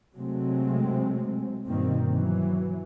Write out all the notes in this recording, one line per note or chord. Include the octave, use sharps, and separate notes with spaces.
C3 F#3 G#3 A3 C4
G2 B2 D#3 A#3 C4
E3 F#3